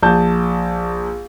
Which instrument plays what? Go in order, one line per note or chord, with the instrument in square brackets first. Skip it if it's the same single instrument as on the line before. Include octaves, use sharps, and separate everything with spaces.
[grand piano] A#1 A5 G6